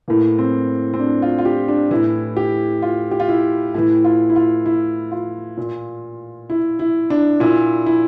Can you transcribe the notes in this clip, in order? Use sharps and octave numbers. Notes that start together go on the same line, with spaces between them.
A2 E3 A#3
C4
C4
D4
F4
F4
G4
D4
A2 E3 E4
G4
F4
G4
F4
E4
A2 E3 E4
F4
E4
F4
E4
F4
A#2
E4
E4
D4
A#2 E4
E4